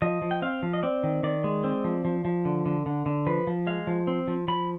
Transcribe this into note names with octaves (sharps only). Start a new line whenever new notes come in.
F3 D#5
F3
G5
C4 F5
F3
D#5
C4 D5
D#3
D#3 D5
G#3
C4
F3
F3
F3
D3
D3
D3
D3
F3 B4
F3
G#3 F5
F3
C4
F3
F3 B5